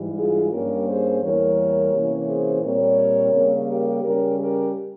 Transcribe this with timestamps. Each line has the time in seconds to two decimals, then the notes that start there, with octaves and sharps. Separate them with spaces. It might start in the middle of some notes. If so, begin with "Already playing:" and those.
Already playing: G#2 E3 G3
0.17 F4 G#4
0.52 G2 G3 A#3 C#4 G4 A#4
0.87 G#4 C5
1.22 E2 E3 G3 A#3 A#4 C#5
1.93 C3 E3 A#3 C#4
2.28 G#4 C5
2.63 A#2 G3 C4 A#4 C#5
3.33 C#3 G3 A#3
3.68 G4 A#4
4.03 C#3 G3 C#4 G4 A#4
4.39 G4 A#4